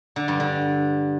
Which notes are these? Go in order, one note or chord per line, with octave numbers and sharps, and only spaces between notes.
D3
G2
D3